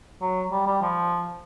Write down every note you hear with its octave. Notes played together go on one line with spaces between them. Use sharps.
F#3
G3
G3
F3